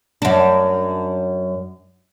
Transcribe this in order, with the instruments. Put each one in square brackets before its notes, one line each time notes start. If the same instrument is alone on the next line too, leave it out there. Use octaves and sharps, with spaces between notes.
[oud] F#2 D4